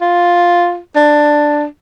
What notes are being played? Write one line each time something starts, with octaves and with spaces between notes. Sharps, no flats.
F4
D4